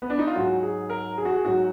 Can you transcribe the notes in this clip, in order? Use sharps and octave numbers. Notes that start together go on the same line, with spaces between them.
B3
D4
D#4
F4
G#2 F#3 F#4
G#4
A#4
G#4
F#4
G#4
G#2 F#3 F#4